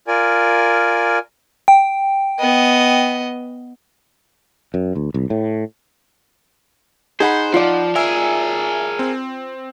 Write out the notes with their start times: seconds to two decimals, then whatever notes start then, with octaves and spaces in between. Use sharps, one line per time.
0.07 F4 A#4 D5 G#5
1.68 G5
2.39 B3 D#5
4.74 F#2
4.95 D2
5.14 C2
5.30 A2
7.20 D#4 G#4 C5 F#5 B5
7.54 F3 F4 D5
7.95 G#4 A#4 E5 G#5 E6
8.99 C4